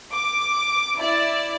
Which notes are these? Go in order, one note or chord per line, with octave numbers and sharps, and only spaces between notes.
D6
E4 D5